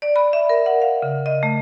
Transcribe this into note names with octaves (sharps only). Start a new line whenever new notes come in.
D5
B5
E5
A#4
F#5
F5
C#3
D#5
A3